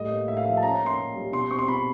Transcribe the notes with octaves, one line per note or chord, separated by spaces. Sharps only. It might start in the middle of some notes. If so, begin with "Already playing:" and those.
Already playing: A2 G3 D#5
A#3
A2 E5
F5
F3 E5
A5
C#4 A#5
A#3
C6
A#2
G3
B2 C6
C4 C#6
C6
B2 B5